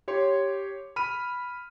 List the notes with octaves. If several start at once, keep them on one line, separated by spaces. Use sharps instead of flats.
G4 C#5 C6
B5 F6 D#7